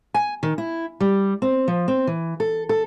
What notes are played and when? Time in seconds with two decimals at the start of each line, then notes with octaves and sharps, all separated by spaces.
0.14 G#5
0.43 D#3
0.58 E4
1.00 G3
1.42 C4
1.68 F3
1.88 C4
2.07 E3
2.40 A4
2.69 A4